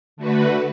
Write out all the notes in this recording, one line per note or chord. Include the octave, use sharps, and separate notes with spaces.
D3 A3 F#4 B4